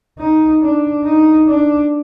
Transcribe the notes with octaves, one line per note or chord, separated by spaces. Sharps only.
D#4
D4
D#4
D4